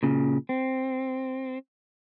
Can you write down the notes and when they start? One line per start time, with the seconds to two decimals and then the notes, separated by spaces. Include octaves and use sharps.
0.03 A#2 C#3
0.49 C4